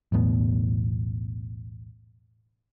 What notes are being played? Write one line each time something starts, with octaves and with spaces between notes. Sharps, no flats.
B1 E2 A2 B3